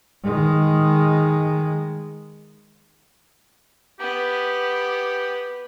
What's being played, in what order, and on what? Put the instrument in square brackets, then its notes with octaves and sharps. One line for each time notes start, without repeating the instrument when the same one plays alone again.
[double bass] D#3 G#3
[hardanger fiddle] B3 [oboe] G4